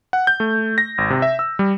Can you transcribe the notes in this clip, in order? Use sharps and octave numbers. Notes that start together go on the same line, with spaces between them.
F#5
G6
A3
A#6
G#1
C3
E5
E6
G3